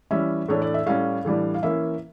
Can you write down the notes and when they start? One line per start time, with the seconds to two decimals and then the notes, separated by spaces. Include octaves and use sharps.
0.11 E3 G3 C#4 E5
0.48 A2 E3 A3 D4 C#5
0.62 D5
0.74 E5
0.86 A2 G3 C#4 F5
1.25 A2 E3 G3 D4
1.54 F5
1.63 E3 A#3 C#4 E5